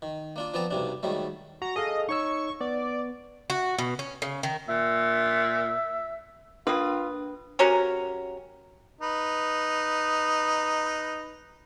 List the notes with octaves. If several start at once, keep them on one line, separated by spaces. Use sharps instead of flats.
D#3
A#3 D4 F4
F3 B3 C4 D5 A5 A#5
B1 G2 C3 D4
G#2 D#3 F#3 G3 A3
F#4 A#5
G#4 A4 D#5 F5
D#4 C#5 C#6 E6
B3 D5
F#4
B2
C#4
C#3
D#3
A#2 E5
A#3 D4 F4 B4 D#6
C3 F#3 C#4 A#4
D#4 B4